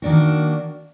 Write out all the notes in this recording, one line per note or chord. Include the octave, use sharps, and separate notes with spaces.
D#3 A#3 D4 F#4